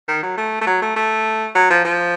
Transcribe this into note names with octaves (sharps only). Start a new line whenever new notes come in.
D#3
F#3
A3
A3
F#3
A3
A3
F#3
F3
F3